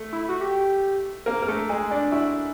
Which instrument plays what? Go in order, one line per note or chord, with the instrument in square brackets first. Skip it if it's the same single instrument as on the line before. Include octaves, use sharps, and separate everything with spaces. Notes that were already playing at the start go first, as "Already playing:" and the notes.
Already playing: [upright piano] A3
[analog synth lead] E4
F#4
G4
[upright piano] A#3 A#4
A#4
A3 A4
G#3 G#4
D4 D5
[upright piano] E4 E5 [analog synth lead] F#4